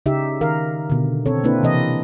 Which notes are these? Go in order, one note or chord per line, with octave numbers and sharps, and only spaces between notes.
C#3 D#4 G4 E5
D#3 A#4 F5
B2 D3
C4 A4 C#5
A#3 C4 D4 E4 B4
C3 E3 D#5